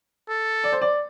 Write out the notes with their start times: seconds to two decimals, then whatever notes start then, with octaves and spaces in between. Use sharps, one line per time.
0.29 A4
0.64 D5
0.72 C5
0.82 D5